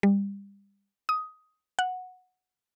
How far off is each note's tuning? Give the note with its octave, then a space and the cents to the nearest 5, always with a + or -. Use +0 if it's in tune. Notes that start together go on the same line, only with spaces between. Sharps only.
G3 +30
D#6 +10
F#5 -10